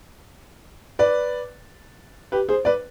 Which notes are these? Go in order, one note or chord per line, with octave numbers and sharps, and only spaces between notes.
B4 D5
G4 B4
G#4 C5
B4 D5